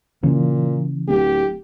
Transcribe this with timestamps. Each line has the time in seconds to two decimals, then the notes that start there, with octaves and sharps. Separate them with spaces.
0.23 A#2 C#3 E3 A#3 C#4
1.08 D1 G4